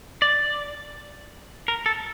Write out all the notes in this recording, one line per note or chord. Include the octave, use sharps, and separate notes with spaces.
D5
A#4
A4